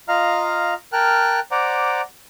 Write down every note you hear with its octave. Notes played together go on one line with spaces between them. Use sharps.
F4 D#5 F5 A#5 F6
A#4 G5 A5 F6 F#6
C5 D5 F#5 A#5 D6